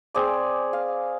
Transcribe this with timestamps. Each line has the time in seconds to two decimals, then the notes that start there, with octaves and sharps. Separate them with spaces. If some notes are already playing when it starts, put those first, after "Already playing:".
0.14 C4 G#4 D5 D6
0.73 F5